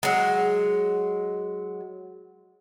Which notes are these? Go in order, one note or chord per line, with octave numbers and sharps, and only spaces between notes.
F#3 G#3